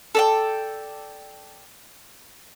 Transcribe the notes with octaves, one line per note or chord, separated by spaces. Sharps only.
A4 D5 G5